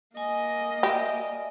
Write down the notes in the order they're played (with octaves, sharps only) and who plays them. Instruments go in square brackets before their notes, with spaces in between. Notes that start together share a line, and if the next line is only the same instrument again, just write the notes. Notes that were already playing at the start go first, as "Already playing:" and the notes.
[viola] A#3 D#5 [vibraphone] G#5
[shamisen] G4 [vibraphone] D5 E5 G#5